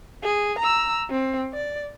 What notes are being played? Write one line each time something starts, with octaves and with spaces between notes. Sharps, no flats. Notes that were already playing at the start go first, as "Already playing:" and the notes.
G#4
A#5 E6
C4
D5